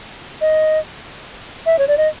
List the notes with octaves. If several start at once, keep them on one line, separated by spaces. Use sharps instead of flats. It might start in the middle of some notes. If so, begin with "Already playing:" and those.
D#5
E5
C#5
D5
D#5